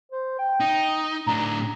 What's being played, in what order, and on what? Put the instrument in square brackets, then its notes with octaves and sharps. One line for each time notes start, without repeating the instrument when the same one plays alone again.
[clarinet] C5
G5
[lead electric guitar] D#4
[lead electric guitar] A2 D4 [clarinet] A#5